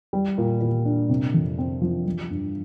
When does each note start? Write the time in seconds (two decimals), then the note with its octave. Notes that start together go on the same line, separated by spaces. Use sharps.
0.13 G3
0.38 A#2
0.61 A#2
0.85 D4
1.09 C3
1.34 F2
1.58 C4
1.82 F3
2.06 F3
2.30 G2